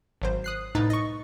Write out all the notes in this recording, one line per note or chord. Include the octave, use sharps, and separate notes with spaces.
G#1 F#3 C5
D#6 F#6 C7
C2 A2 D#4 B4 A6
D#5 C#6